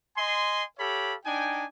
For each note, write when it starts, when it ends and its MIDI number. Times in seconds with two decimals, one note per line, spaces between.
0.17 0.63 75
0.17 0.63 80
0.17 0.63 84
0.79 1.14 67
0.79 1.14 69
0.79 1.14 73
0.79 1.14 77
0.79 1.14 83
1.25 1.65 62
1.25 1.65 63
1.25 1.65 79
1.25 1.65 80